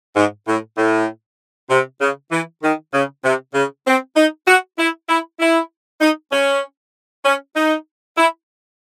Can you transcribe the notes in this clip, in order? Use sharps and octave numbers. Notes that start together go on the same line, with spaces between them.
G#2
A2
A2
C3
C#3
E3
D#3
C#3
C3
C#3
C4
D#4
F#4
E4
E4
E4
D#4
C#4
C#4
D#4
E4